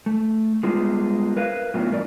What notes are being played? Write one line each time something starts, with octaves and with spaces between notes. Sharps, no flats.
A3
G3 G#3 B3 F4
A#4 B4 F5
A2 F#3 B3 F4
E2 G2 D4 A#4 D5